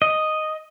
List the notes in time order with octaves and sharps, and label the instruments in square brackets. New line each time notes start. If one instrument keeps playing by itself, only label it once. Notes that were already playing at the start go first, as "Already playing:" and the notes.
[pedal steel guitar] D#5